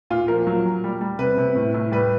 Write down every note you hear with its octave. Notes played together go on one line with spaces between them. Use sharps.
A#2 F4
F3 A#4
F#3
A#2
G3
G3
C3 B4
C3
A2
A2
G3 B4